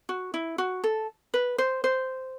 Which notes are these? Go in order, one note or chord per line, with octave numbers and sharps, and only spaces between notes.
F#4
E4
F#4
A4
B4
C5
C5